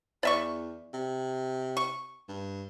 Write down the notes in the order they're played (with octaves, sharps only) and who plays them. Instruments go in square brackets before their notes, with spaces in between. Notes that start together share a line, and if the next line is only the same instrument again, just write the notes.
[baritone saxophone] E2 [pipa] D5 E5 C#6
[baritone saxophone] C3
[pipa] C#6
[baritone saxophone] G2